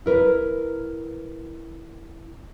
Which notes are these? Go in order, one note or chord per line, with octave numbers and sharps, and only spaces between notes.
E4 A#4 B4